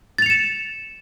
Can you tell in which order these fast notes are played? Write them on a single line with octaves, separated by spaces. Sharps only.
A6 F7 C#7 E7